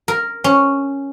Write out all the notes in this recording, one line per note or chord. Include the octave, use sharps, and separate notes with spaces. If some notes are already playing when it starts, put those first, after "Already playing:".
A#4
C#4